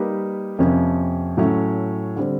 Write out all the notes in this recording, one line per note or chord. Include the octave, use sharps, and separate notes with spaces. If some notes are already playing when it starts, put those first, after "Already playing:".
Already playing: G3 A#3 D#4 G4 B4
F2 C3 F3 A#3 C#4
A2 F#3 A3 C#4
D3 G3 C4